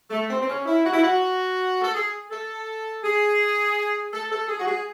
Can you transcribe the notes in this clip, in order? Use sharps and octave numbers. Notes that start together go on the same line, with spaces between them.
A3
C4
C4
C#4
E4
F#4
E4
F#4
A4
G#4
A4
G#4
A4
A4
G#4
F#4
G#4